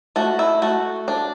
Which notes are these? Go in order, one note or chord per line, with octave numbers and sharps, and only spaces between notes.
A3 F#4
E4
A3 F#4
D4